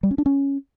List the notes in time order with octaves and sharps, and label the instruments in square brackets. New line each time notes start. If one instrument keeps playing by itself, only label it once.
[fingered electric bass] G3
C#4
D4
C#4